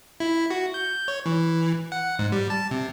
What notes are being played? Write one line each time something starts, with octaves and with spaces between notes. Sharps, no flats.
E4
F#4
G6
C#5
E3
F#5
G#2
G3
A5
C3